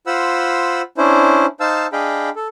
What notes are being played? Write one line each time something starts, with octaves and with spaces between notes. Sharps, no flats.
F4 C5 F#5 B5 E6
C#4 D4 E4 C5
D#4 C5 F5 A5 E6
D4 G#4 D#5 F5 G5 B5
A4